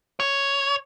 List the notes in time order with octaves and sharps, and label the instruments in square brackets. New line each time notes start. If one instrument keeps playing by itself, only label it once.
[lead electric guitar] C#5